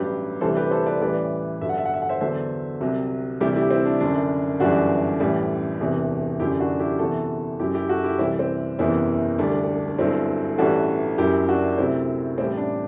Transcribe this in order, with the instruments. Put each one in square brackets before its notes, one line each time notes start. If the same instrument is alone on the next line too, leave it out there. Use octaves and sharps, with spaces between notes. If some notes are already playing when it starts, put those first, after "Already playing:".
Already playing: [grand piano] A1 G2 F#3 G4 B4
D2 C3 E3 G3 A4 C5
G4 B4
A4 C5
B4 D5
A1 A2 E3 G3 B4 D5
G1 G2 F#3 E5
F#5
E5
F#5
E5
F#5
C5 E5
E2 D3 F#3 C5 E5
C2 C3 F#3
D2 C3 E3 G3 E4 G4
E4 G4
C4 E4
D4
F#1 F#2 D3 D4
G1 F#2 E3 G3 D4 F#4
A1 A2 E3 G3
E1 E2 C3 E3
F#1 F#2 D3 F#3 E4 G4
D4 F#4
E4 G4
E2 C3 E3 F#4 A4
F#1 F#2 F#3 E4 G4
E4 G4
F#4 A4
E4 G4
C2 C3 E3 G3 C4 E4
C4
F#1 E2 C3 E3 C4 E4
E1 D2 D3 G3 D4
G1 G2 F#3 C4 E4
A1 G2 E3 G3 F#4 A4
F#1 F#2 F#3 E4 G4
D4 F#4
D2 C3 F#3 C4 E4
A1 A2 G3 C4 E4
D4